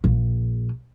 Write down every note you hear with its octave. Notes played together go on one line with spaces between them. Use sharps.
A#1